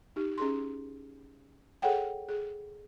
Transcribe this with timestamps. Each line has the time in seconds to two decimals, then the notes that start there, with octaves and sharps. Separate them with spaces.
0.16 D#4 G4
0.38 C#4 G#4 C6
1.82 G#4 A4 C#5 F#5 G5
2.28 G#4